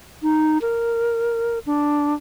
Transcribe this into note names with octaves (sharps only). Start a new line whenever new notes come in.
D#4
A#4
D4